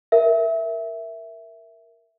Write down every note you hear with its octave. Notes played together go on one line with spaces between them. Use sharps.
A#4 E5